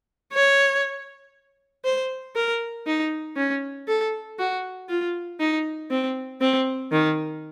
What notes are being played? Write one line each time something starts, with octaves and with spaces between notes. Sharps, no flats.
C#5
C5
A#4
D#4
C#4
A4
F#4
F4
D#4
C4
C4
D#3